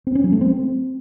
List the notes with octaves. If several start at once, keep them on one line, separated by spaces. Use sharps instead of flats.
C4
C#4
F#3
A3
C4